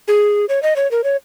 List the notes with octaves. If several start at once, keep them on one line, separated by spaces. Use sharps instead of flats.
G#4
C#5
D#5
C#5
A#4
C#5